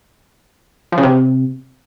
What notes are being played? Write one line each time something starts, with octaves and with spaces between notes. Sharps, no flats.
F3
C#3
C3